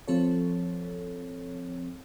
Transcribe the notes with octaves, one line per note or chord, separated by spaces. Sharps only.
F3 C4 A4 C#5